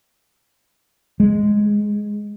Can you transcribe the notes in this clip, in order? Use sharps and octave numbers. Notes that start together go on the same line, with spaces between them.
G#3